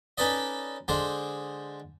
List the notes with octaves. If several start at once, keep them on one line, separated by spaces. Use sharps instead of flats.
C#4 D#4 A4 B4 D5 D#5
D3 G#3 D4 C5